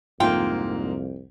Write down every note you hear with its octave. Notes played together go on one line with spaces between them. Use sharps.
C2 F2 G#2 A#3 F4 G5